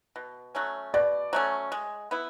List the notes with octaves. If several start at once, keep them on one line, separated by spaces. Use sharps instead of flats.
B2
F#3 A3 C#4
B2 D5
F#3 A3 C#4
G#3
B3 E4